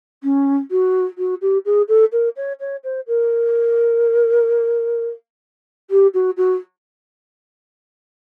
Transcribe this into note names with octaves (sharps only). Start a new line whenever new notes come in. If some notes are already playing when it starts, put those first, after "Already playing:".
C#4
F#4
F#4
G4
G#4
A4
A#4
C#5
C#5
C5
A#4
G4
F#4
F#4